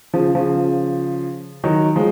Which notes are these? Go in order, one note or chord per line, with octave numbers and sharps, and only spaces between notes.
C#3 F3
C#3 F3
D#3 F#3
F3 G#3